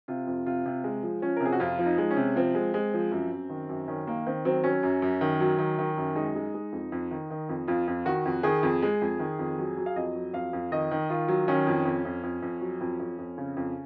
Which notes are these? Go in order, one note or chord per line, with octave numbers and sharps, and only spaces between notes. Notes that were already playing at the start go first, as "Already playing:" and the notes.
C3 F4
F2
C3 F4
C3
G#3
F3
F3 C#4
A#4
C3 G#4
F#4
F2 F4
F3
D#4
G#3
C#4
C3
F3 C4
G#3
G#3
F3
F#2
F#2
D#3
F#2
D#3 C#4
D#3 A#3
D#3 C4
F#3 C4
F#3 C#4
F#2
F#2
D#3
F#3
D#3
D#3
F#2
G#3 D#4
G#3
G#3
F2
F2
D#3
D#3
F2
F2 F4
F2
D#3 F#4
F2
D#3 G#4
F2
G#3
F2
D#3
F2
F#3
F#3
F5
F2 D#5
F#3
F2 F5
F2
D#3 D#5
D#3
D#3 F4
F#3
D#3 C#4
F2
F2
F2
F2
F2
F#3
F2
F2
F2
C#3
F2